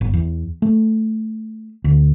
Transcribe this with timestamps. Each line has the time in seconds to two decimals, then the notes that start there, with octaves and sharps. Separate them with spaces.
0.01 G1
0.13 E2
0.62 A3
1.84 D2